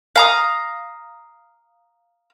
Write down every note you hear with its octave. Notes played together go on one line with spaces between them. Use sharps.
F5 A#5 D#6